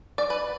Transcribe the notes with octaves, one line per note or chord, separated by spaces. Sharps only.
D5
B4